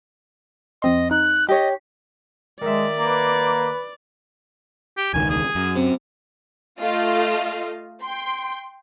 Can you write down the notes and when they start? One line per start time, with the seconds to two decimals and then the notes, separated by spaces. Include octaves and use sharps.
0.82 F2 C4 D#5 C6
1.11 D#4 F#6
1.48 G4 C#5 D#5
2.62 D#3 G#3 D5 E5
2.98 A#3 B4
4.98 G4
5.14 E1 C#2 D#3 G#5
5.30 G#4
5.55 F#2
5.76 C3
6.79 A3 F4 D#5 F5 F6 C7
8.03 G5 C6